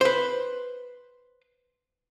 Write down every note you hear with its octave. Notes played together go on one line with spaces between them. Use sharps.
B4 C5